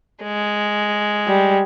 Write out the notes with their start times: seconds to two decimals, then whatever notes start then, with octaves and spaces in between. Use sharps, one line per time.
0.23 G#3
1.28 G3